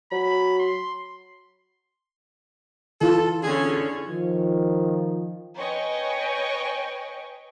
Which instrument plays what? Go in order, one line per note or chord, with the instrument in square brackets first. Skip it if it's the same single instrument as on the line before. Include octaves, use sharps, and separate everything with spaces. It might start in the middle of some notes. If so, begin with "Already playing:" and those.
[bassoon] F#3 [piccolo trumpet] B5
[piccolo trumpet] C6
[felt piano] E3 F4 [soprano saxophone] A4
[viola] D3 C#4 [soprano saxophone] G#4
[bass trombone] D#3 [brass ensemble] F3
[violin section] B4 C#5 D#5 G5 G#5 C#6